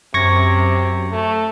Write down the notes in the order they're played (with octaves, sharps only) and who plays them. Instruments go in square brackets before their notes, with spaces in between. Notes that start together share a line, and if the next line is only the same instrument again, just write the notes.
[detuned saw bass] F#2 [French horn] C3 [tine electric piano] C#6 G#6 A#6
[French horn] A3